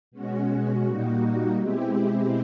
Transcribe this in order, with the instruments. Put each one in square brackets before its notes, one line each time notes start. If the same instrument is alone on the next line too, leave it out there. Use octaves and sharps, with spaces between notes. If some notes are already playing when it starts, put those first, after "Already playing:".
[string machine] B2 G#3 C#4 F#4
A#2 G3 A#3 D#4 F#4
B2 G#3 C4 E4 G4